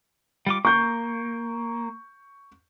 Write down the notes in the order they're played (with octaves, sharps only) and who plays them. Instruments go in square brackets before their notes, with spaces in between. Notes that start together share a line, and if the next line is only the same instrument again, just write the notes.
[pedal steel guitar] G3 F4 D6
[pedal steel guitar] A#3 [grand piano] C#6 G6